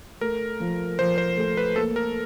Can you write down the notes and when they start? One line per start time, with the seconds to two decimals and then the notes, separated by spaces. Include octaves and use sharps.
0.21 A3 A#4
0.60 F3
0.99 F3 C5
1.18 C5
1.37 A3
1.57 B4
1.76 A#3 A4
1.96 A#4